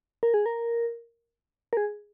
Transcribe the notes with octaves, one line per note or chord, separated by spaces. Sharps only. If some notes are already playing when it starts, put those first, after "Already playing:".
A#4
G#4
A#4
A#4
G#4